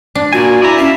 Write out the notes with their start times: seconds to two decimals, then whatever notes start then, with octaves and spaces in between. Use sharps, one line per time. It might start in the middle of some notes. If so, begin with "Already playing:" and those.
0.15 D4
0.33 A#2 F#4 D5 G#5
0.62 E4 D5 A#5
0.78 C#4 E5 F5